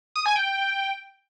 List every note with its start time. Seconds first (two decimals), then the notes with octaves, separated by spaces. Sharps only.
0.16 D#6
0.26 G#5
0.36 G5